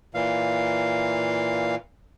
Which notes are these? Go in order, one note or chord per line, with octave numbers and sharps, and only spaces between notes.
A#2 E3 F5